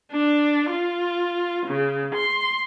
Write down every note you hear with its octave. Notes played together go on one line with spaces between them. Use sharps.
D4
F4
C#3
C6